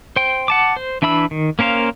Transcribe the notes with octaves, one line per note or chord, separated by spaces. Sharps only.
C5 G5
F#5 A5 D6
C5
E3 D4 E5 B5 E6
D#3
A#3 C#4 A#4 C5 F5